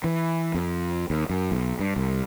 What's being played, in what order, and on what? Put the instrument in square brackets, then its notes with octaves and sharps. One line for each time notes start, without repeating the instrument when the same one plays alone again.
[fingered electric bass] E3
F2
D#2
F#2
B1
G2
C2